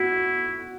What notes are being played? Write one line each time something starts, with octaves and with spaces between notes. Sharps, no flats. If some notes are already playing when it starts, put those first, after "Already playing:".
Already playing: E4 F#4